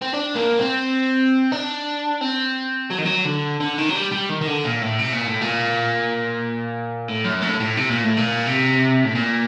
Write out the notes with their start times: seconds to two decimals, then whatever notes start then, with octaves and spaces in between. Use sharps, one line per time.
0.02 C4
0.14 D4
0.36 A#3
0.59 C4
1.52 D4
2.21 C4
2.91 F#3
2.99 D#3
3.05 F#3
3.25 D3
3.60 D3
3.78 D#3
3.89 F#3
3.96 G3
4.12 G3
4.29 D#3
4.41 D#3
4.47 D3
4.65 A#2
4.82 A2
4.99 C3
5.13 A#2
5.27 A2
5.41 A#2
7.08 A2
7.24 F#2
7.42 A2
7.60 A2
7.77 C3
7.90 A#2
8.04 A2
8.17 A#2
8.46 C3
9.04 A2
9.15 A#2